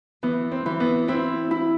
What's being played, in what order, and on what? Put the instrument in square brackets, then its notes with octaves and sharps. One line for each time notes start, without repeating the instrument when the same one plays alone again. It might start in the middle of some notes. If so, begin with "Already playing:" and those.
[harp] E3 [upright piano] B3
[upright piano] C4
[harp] E3
[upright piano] B3
[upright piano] C4 [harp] E4
[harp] E4